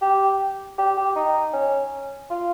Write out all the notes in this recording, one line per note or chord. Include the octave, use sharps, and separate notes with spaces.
G4
G4
G4
D#4
C#4
F4